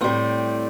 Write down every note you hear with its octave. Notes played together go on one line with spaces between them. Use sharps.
A2 G3 C4